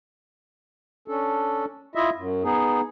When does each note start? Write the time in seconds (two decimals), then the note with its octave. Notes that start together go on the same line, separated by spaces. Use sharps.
1.08 C#4 D4 A4
1.95 E4 F4 D#5 E5
2.16 F#2
2.43 B3 D#4 G#4